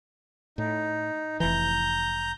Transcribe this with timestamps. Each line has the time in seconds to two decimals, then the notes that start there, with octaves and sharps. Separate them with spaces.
0.58 A2 D#4
1.40 F1 E3 A#5 G6